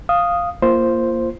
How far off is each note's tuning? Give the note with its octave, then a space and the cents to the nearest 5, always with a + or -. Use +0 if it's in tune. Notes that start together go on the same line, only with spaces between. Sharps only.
F5 +0 D#6 +0
A#3 +0 F4 -30 C5 +0